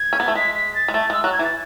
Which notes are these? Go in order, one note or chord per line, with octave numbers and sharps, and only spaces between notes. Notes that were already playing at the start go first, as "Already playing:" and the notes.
Already playing: G#6
C#4
B3
A3
G#3 B6
B6
A6
G#3
A3 A6
G#3 E6
F#3 F#6
G#6
E3
A6